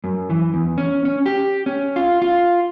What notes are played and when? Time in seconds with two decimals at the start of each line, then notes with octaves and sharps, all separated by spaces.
0.04 F#2
0.30 E3
0.54 E2
0.78 C#4
1.05 C#4
1.26 G4
1.66 C#4
1.96 F4
2.22 F4